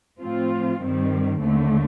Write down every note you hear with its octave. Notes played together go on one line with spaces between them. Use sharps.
A2 F3 C4 F4
G2 D#3 G3 C4
D#2 D3 A3